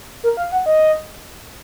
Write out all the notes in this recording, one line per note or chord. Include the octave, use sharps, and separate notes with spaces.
A#4
F5
F#5
D#5